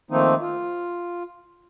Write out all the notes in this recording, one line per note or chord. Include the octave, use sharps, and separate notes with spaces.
D#3 F3 A3 A#3 C4 D#4
F4